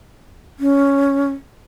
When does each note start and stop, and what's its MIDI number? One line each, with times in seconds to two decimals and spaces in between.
0.60 1.29 61